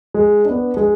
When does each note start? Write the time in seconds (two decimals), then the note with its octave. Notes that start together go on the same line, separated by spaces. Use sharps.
0.14 G#3
0.45 B3 D4
0.77 G#3